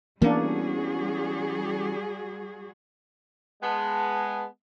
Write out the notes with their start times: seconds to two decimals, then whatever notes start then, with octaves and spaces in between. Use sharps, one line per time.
0.22 E3 G3 A#3 B3 C#4 D4 F#4 G#4
3.63 G#3 B3 A5